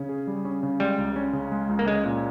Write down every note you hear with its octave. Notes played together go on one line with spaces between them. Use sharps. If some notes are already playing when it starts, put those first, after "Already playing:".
Already playing: C#3 C#4
G#4
G3
C#4
C#3
G3 G#3
C#2
C#4
C#3
G#3
C#2
A#3
G#3 C#4
A#2